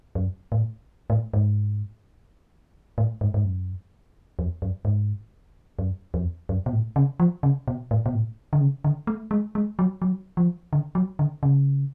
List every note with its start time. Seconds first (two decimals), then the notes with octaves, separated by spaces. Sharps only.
0.15 F#2
0.52 A2
1.10 A2
1.34 G#2
2.98 A2
3.21 G#2
3.34 G#2
3.45 F#2
4.39 F2
4.62 F#2
4.85 G#2
5.79 F#2
6.14 F2
6.49 F#2
6.66 B2
6.73 A2
6.96 C#3
7.20 F3
7.43 C#3
7.68 B2
7.91 A2
8.06 B2
8.14 A2
8.53 D3
8.60 C#3
8.84 D3
9.07 A3
9.31 G#3
9.55 G#3
9.79 F#3
10.02 F#3
10.37 F3
10.73 D3
10.95 F#3
11.19 D3
11.43 C#3